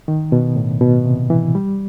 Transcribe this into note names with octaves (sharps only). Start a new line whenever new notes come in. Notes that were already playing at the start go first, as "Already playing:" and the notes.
D#3
B2
A2
B2
C3
E3
G3